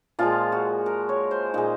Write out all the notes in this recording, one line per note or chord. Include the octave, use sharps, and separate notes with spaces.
A#2 F3 G#3 F4
F#4
A#4
C#5
C5
A#2 G#3 D#4